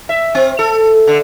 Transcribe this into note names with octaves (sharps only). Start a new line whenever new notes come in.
E5
C4
A4
D3